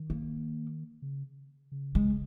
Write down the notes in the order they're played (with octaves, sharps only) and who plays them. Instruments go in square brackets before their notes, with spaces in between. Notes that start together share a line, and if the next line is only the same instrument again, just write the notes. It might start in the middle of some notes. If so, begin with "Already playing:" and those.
Already playing: [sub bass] D#3
[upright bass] A#3
[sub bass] C#3
C#3
[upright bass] G#3